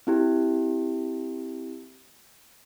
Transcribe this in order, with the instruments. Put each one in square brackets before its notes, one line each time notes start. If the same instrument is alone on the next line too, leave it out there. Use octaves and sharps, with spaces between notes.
[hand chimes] C4 E4 G4